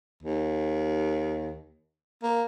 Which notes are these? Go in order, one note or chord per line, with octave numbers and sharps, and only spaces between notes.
D#2
A#3